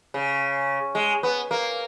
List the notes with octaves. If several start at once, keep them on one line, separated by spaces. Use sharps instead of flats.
C#3
G#3
B3
A#3